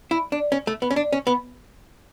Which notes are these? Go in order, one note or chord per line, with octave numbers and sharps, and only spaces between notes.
E4
D4
C#4
A3
B3
C#4
D4
C#4
B3